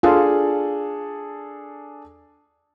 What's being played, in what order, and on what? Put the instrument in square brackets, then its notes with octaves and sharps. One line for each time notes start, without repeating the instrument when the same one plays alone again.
[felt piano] D4 G#4 A4 [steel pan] F4